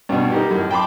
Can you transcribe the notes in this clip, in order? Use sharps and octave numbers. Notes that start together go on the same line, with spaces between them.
G2 B2
A#3 D#4 G4
F#2 A2
G5 A5 B5 C6 D6